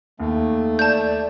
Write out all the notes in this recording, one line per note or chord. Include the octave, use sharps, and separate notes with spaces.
D#2 A3
D5 A5 G6